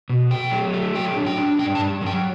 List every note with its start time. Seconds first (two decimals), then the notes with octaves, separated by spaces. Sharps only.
0.10 B2
0.31 A3 G5
0.51 F#3
0.73 A3
0.95 F#3 G5
1.17 D4
1.26 G5
1.37 D4
1.58 G2 G5
1.75 A5
1.80 G2
2.01 F#3
2.07 G5